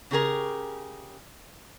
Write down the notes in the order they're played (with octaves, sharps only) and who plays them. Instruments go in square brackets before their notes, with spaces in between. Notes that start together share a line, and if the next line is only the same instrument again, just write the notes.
[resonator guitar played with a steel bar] C#3 G4 G#4 A#4